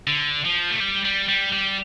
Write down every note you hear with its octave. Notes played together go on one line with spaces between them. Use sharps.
D3
F3
A3
G3
G3
G3
G3